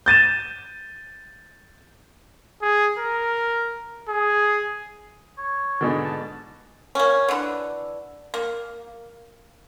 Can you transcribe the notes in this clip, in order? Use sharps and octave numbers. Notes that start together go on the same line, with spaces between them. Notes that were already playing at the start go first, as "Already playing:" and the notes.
G6 A6 D#7 E7
G#4
A#4
G#4
C#5
G#2 B2 D3
A5
A#3 C#4
D3 E3
A#3